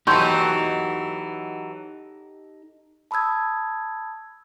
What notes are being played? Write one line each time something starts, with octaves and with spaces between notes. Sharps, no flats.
E3 F#3 D#4 G4 A4 C6 C#6 G6
A5 B5 D#6 E6 G#6